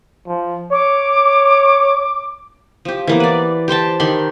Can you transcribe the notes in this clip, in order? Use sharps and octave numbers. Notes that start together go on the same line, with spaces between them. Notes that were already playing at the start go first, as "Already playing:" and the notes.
F3
C#5 D6
F3 G4
E3 A#3 B3
B4 D5
G4 C5 G5 A5
D#3 G4 B5 C6